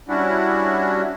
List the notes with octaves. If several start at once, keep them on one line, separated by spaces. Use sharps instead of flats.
G3 C#4 D4 E4 F#4